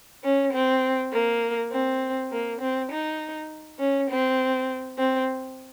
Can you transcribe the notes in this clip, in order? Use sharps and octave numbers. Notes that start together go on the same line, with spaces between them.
C#4
C4
A#3
C4
A#3
C4
D#4
C#4
C4
C4